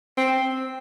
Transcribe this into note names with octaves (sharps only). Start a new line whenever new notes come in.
C4